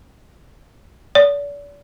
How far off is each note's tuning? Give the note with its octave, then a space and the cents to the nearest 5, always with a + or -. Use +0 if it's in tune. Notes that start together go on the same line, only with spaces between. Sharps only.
D5 -40